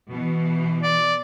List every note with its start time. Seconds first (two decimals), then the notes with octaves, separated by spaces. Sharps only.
0.10 B2 E3
0.83 D5